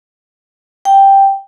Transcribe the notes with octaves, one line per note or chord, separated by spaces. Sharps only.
G5